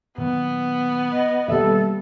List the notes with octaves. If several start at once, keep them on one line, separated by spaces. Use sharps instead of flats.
A#2 D#3 F#3 B3
D#5
B2 D#3 G3 A#3 A4 E5